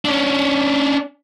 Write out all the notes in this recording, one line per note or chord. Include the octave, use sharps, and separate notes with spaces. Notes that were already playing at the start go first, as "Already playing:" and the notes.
C#4 D4